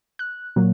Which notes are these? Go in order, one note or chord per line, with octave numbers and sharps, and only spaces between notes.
F#6
A#2 F#3 A#3